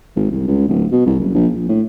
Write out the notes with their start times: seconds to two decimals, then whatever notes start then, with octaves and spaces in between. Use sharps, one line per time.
0.16 G#1
0.31 C2
0.47 C#2
0.68 D1
0.92 B2
1.06 C2
1.20 F#1
1.34 A#1
1.55 A#1
1.69 A2